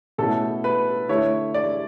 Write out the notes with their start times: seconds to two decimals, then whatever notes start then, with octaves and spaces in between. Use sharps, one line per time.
0.18 B2 A3 C#4 E4 A4
0.64 B4
1.09 D3 A3 E4 C#5
1.54 D5